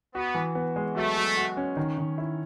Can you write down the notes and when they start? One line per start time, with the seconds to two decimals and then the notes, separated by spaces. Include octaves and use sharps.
0.14 B3 F#4
0.35 E3
0.55 B3
0.76 G#3
0.96 F#3 A3
1.16 F#3
1.37 F#4
1.57 C#4
1.77 D#3
1.98 D#3
2.18 E4